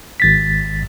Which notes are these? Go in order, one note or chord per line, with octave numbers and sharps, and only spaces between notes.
G#1 A6 B6